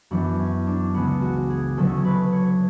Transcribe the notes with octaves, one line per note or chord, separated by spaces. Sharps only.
F#2 E3 B3 D4
C#4
D4
C#2 C#3 G#3 B3
F#4
G#4
D2 D3 F#3 C#4 A4
B4
C#5